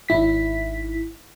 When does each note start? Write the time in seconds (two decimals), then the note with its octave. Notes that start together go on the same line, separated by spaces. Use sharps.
0.09 G#1 E4 B6